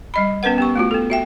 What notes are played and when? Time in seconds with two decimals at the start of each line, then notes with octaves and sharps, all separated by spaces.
0.14 G3 D#5 B5
0.43 B3 C#4 A#4 B4 F#5
0.58 B3 G4 C#6
0.76 A3 F4 F#4
0.91 B3 A4
1.10 F#4 E5 G5